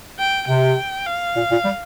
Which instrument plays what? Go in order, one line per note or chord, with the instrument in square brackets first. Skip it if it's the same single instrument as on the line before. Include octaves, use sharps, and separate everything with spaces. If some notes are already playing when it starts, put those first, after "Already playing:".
[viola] G5
[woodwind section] C3 [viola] G5
[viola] F5
[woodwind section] A#2
A#2
G3